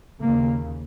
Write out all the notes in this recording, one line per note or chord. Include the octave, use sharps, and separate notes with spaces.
D#2 C#3 A#3